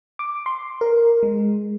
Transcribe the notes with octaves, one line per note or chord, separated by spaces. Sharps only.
D6
C6
A#4
G#3